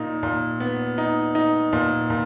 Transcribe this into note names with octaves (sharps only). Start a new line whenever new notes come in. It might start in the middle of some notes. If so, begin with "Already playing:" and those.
Already playing: A#2 D#4
A#2
B3
D#4
D#4
A#2
A#2